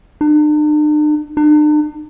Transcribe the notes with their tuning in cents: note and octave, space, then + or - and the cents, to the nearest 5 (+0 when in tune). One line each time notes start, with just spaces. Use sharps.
D4 +45
D4 +45